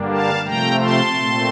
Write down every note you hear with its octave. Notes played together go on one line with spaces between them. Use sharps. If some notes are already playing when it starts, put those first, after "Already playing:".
Already playing: G2 D3 G3 A#3 D4
F5 A5
C3 F3 A3 G5 A#5
A5 C6
A#2 A3 C4